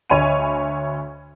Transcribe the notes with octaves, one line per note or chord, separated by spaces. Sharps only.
D2 C#5 D#5 G#5 B5 D#7